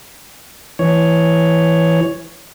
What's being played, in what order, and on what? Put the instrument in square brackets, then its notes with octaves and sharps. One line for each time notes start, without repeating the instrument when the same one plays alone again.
[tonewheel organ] E3 C#5